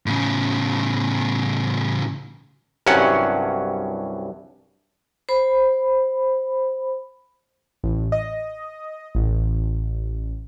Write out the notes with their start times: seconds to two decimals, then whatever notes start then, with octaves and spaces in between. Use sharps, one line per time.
0.06 A2 C#3
2.87 C2 G2 F#3 C#4 F#5
5.29 C5 B5
7.83 A1
8.12 D#5
9.15 A1